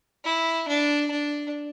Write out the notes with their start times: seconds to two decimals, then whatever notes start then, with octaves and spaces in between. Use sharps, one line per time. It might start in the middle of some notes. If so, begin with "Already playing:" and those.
0.24 E4
0.69 D4
1.11 D4